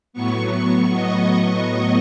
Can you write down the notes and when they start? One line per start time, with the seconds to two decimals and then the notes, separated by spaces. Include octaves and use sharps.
0.13 A2 F#3 B3 C#6
0.93 D#5